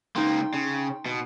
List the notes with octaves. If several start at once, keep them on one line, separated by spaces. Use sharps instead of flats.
C#2 A#3 D#4 G5 C6
C#3
B2